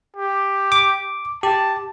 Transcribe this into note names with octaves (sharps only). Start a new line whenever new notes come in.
G4
D6
G4 A5